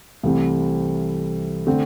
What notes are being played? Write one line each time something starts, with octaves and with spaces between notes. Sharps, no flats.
C2 C3 E3 A3 C4
D3 A3 C4